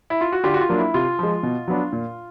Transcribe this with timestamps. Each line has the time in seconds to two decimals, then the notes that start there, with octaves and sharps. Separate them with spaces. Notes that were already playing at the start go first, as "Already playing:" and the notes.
0.10 E4
0.21 F4
0.32 F#4
0.44 D3 F4 G4
0.54 F#4
0.61 F4
0.69 F#3 A#3 D4
0.78 E4
0.94 C3 F4
1.19 F3 G#3
1.43 B2
1.68 F#3 B3 D4
1.93 A#2